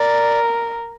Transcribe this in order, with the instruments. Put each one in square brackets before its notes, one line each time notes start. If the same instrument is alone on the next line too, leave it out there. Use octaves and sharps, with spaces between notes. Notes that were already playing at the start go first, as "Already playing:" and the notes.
Already playing: [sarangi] A#4 [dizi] D5